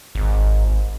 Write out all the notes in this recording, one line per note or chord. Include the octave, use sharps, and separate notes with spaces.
G#1